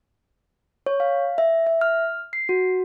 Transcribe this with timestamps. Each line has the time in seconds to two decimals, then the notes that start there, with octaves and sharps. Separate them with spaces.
0.86 C#5
1.00 F5
1.38 E5
1.67 E5
1.81 F6
2.33 C7
2.49 F#4